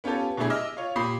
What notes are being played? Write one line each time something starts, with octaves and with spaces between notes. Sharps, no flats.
B3 C#4 F4 G4 A4
B2 F#3 A3 D4 E4 G#4
D#5 E5 D6 E6 F6
F4 C#5 F5
A#2 G4 B5 D#6 C7